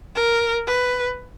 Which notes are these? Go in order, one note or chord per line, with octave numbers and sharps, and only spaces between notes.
A#4
B4